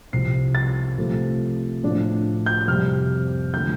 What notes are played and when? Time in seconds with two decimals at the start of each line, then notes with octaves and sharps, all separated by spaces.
0.13 C2 C3 F3 C4 C7
0.55 A6
0.98 C3 F3 A3
1.83 A2 F3 D4
2.46 G6
2.68 F2 C3 G3 F6
3.54 D3 F3 A3 G6